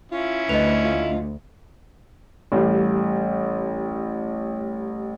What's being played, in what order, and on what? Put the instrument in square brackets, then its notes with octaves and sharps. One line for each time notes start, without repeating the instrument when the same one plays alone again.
[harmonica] C#4 E4 [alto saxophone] F4
[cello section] D2 [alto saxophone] B4 [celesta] D#5 F7
[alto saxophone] F4
[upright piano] A1 G3